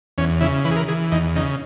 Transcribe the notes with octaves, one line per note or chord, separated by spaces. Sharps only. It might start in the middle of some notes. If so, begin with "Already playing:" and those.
E2 C#4
C#3 E4
E3 B4
G#4
A#4
E3 G#4
E2 D#4
C#3 D#4